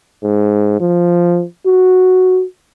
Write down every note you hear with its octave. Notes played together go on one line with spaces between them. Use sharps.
G#2
F3
F#4